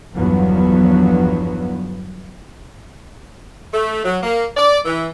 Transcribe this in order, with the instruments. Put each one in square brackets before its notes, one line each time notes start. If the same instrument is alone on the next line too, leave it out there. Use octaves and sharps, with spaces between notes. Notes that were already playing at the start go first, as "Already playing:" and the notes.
[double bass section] G1 E2 G2 F3 F#3 B3
[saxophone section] A3
F#3
A#3
D5
E3